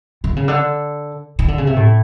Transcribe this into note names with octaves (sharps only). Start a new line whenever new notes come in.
D3
C#3
D3
D#3
D3
C#3
C3
A2